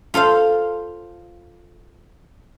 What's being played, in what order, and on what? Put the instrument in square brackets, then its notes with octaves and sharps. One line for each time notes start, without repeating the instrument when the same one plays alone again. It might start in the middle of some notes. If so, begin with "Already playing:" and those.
[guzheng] F4 A4 C5 F5